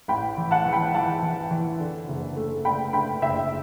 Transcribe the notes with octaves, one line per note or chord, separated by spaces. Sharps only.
A1 G5 B5
E3
F#5 A5
E3
G5 B5
E3 F#5 A5
E3
E3
D3
F#1
A3
D3 G5 B5
D3 G5 B5
F#1 E5 G5